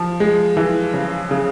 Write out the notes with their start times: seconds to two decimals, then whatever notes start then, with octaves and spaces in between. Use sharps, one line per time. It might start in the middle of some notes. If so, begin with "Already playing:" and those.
Already playing: F3
0.20 G#3
0.57 E3
0.94 C#3
1.31 C#3